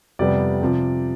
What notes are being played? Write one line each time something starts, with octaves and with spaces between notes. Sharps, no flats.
F2 C3 G3 B3 D5
C3 F3